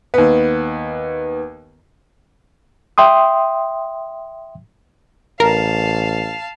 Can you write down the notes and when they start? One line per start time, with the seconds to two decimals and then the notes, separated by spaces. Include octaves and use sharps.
0.14 D#2 B3
2.98 E5 G5 C6 D#6
5.40 A1 A#4 F5 A5